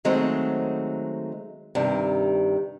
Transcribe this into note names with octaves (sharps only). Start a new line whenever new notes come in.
D#3 F#3 G#3 A3 C4
G2 C3 D#3